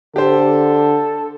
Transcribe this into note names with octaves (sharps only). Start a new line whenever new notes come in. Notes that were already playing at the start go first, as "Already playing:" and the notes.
D3 G4 A4 C5